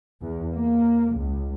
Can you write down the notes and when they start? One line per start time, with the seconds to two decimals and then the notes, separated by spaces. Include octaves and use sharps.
0.21 E2
0.52 A#3
1.15 C#2